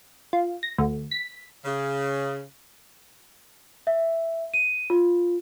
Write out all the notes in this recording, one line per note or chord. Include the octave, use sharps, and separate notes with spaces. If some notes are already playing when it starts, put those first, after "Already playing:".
F4
A#6
D2
B6
C#3
E5
D#7
F4